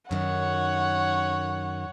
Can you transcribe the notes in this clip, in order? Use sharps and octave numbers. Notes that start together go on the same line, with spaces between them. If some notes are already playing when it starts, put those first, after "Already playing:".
F#2 D#3 C#5 F#5